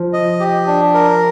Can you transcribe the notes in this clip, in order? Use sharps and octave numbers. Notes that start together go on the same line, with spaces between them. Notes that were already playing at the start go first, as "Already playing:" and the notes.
Already playing: F3
D#5
G4
D4
A#4